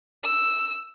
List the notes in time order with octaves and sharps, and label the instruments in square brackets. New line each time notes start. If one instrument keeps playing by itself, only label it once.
[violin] E6